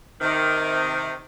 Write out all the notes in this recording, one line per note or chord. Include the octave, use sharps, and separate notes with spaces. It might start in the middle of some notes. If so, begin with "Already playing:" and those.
C3 D#3